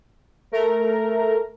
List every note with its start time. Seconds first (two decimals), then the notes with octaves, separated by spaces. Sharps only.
0.52 A3 A#4